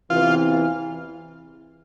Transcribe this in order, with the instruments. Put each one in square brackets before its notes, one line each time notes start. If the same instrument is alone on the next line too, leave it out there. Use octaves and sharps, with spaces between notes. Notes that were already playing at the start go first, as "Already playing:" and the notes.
[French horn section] E2 C3 E3 [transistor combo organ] F4